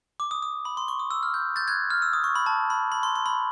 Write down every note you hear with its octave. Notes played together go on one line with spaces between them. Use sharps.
D6
D#6
D#6
B5
C6
C#6
D#6
E6
F6
G6
G6 A6
F#6 G#6
F6
E6
D#6
C#6
B5
A5
B5
B5
C6
C6
B5